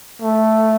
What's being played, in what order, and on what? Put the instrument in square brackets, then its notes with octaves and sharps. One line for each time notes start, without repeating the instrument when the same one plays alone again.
[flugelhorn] A3